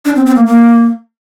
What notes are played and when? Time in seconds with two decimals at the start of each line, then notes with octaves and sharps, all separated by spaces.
0.05 D4
0.16 C4
0.26 C4
0.35 A#3
0.46 A#3